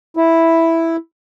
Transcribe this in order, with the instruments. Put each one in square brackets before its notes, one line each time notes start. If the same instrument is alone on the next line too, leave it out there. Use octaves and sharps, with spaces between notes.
[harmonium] E4